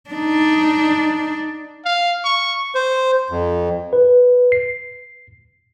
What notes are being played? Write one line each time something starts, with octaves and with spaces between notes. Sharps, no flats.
D4 D#4
F5
C#6
C5
F2
B4
C7